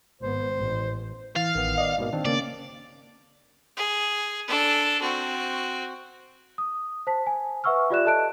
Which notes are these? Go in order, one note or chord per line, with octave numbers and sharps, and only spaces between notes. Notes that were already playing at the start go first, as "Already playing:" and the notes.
G#1 B3 C5
A1
E3 F5 A6
A1 D#3 B3
D5 D#5
G#2 B2 A#3
D#3 C4 D4
C#3 A#3 C#4 D5
G#4
D4 A4
C4 F#4
D#6
C5 A5 B6
G#5
B4 E5 F#5 C#6 E6 F6
F4 G4 D5 E5 F#6 E7
A4 D#5 A5 F#6 D7